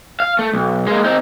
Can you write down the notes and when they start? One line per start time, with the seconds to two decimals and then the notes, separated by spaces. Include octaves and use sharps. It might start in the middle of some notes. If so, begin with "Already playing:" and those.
0.20 F5
0.39 A3
0.53 B1
0.87 G#3 A#3
1.05 C4 D#4